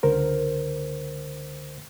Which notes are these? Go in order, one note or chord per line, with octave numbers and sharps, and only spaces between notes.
C#2 D3 A#4 C5